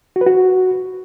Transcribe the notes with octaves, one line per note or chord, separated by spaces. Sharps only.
F#4
B4
F#4